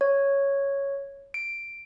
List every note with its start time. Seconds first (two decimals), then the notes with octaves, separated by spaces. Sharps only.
0.01 C#5
1.34 D7